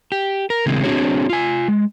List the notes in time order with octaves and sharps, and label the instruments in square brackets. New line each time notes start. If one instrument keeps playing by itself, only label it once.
[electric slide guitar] G4
A#4
C#3 E3 G#3 A#3 C4
C4 D4 F#4 G#4 C#5
F4 G#5
G#3